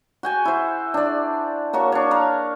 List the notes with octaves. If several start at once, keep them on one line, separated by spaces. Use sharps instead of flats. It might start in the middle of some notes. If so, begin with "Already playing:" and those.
F#4 G5 G#5
E4 C5
D4 D5
A#3 F#4 A#4 C#5
D4 C#5
A#4 F5